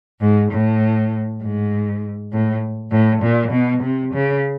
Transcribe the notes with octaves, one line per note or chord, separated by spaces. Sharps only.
G#2
A2
G#2
A2
A2
A#2
B2
C3
C#3